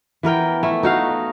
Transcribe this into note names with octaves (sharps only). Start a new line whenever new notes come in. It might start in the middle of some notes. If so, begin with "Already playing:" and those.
E3 B3 A#4 G5
A3 E4
D#4 F#4 F5